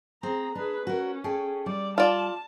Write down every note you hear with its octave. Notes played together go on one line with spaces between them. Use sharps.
C4 G#4 A#5
D4 G#4 B4
C#4 F#4 A#4
G#4 A4 G5
G3 D5
F4 D5 A5